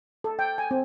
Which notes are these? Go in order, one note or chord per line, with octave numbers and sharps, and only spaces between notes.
A4
G5
G#5
C4